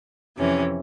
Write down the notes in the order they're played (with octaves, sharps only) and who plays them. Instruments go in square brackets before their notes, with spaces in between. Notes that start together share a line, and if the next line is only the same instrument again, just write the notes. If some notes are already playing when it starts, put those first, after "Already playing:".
[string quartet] F2 C3 E3 C#4